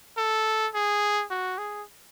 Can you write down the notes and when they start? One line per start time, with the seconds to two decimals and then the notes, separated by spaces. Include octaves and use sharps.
0.17 A4
0.74 G#4
1.31 F#4
1.58 G#4